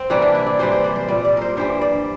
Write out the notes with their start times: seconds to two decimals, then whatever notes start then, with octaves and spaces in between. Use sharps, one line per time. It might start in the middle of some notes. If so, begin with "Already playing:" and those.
Already playing: C4
0.10 C3 E3 G3 A#3
0.22 D4
0.34 E4
0.47 D5
0.59 C3 E3 G3 C5
0.72 C5
0.84 D5
0.96 C5
1.08 A#2 G3 D5
1.25 D5
1.37 A#4 C5
1.57 G2 E3 G3 C5
1.81 D5